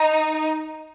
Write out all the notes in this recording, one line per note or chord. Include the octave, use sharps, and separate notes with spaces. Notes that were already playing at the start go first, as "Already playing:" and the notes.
Already playing: D#4